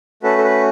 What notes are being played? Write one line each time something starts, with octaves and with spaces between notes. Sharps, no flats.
A3 C#4 F#4 A4 B4
A4
B4